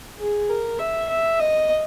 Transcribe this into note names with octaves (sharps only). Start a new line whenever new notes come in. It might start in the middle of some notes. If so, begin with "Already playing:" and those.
G#4
A#4
E5
E5
D#5